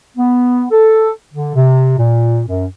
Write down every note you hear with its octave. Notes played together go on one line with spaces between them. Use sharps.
B3
A4
D3
C3
A#2
F#2